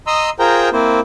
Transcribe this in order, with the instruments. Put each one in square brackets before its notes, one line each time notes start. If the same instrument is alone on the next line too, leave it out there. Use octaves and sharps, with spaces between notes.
[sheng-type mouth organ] D#5 A#5 C6 D#6 E6
F4 G#4 A#4 C5 G5 A#5
A#3 C4 E4 C5